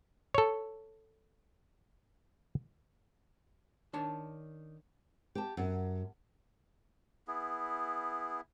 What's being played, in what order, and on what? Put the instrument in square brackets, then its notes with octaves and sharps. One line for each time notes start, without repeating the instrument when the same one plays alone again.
[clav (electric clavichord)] A4 C#5
[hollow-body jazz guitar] D#3 D4 C#5 A5
[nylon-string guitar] G4 A5
F#2
[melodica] B3 E4 G#4